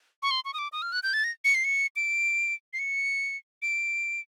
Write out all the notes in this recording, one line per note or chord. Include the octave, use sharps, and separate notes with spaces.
C#6
C6
C#6
D#6
D6
D#6
F6
F#6
G6
A6
A#6
C#7
C7
C#7
D7
C7
C#7
D7